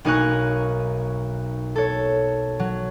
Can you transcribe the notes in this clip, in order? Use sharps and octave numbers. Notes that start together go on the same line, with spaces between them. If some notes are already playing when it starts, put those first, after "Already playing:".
B1 A#3 D#4 G#5 C#6 F#6
A4 C#5
F#3